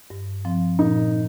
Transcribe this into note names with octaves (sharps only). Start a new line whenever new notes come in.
G2
F3 C4
A#2 D#4